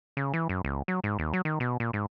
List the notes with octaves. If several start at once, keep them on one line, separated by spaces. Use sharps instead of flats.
C#3
E3
F#2
C#2
F#3
G#2
D#2
F#3
D#3
B2
A#2
G#2